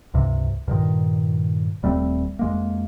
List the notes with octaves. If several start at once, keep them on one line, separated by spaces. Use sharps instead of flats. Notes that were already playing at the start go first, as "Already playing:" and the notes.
C#2 G2 C3
G2 A#2 D#3
D#1 G3 A3 C4
F2 G#3 A#3